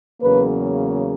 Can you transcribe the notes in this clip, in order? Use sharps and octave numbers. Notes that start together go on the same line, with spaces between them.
E2 C#3 F#3 A#3 B4